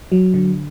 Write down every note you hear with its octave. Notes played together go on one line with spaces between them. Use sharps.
F#3
D3